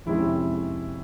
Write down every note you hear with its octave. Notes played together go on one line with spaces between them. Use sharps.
F2 C3 D#3 G#3 C#4 E4